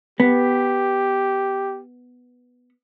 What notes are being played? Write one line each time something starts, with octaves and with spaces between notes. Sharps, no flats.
B3 G4